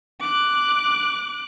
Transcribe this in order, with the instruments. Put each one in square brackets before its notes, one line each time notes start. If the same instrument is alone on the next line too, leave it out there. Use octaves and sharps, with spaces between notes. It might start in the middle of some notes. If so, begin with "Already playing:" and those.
[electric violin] D6 F#6